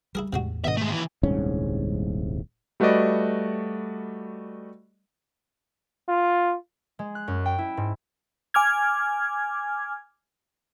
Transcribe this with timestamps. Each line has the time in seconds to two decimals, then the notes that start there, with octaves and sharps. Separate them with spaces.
0.15 G3 E4 G#4 A#4
0.33 E2 A2 C3 G#3 F#4
0.64 G#2 B2 D3 D#3 D#5 E5
0.77 G#3 A3
0.90 D#2 E3
1.23 D#1 C2 G#2 C#4
2.80 G3 A3 F#4 B4 D5 D#5
6.08 F4
6.99 G#3
7.15 F#6
7.28 F#2
7.45 G5
7.58 E4
7.77 G#2
8.54 G#5 D6 F6 G#6